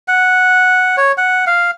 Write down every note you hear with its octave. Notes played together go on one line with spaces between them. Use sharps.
F#5
C#5
F#5
F5